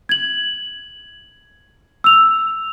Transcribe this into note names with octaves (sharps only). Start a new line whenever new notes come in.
G#6 F#7
E6 F7